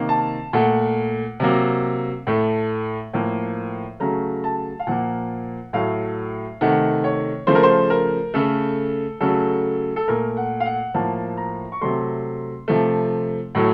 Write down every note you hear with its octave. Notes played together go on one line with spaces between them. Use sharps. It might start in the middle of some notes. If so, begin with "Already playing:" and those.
Already playing: C3 D#3 A#3
A5
A#2 A3 F#5
C3 F#3 A#3
A2 A3
A2 F3 A#3
C#3 F#3 A3 A#5
A5
F5
A#2 F3 A#3 F#5
A2 F#3 A3 F5
C3 D#3 A3 F#5
C#5
C#3 F3 A3 C5
A#4
C5
A#4
C#3 A3 A4
C#3 F#3 A3 A4
A4
A#2 A3 A#4
F#5
F5
F#5
A2 F3 A#3 A5
A#5
C#6
C3 F#3 A3 C6
C3 F3 A3
A2 F#3 A3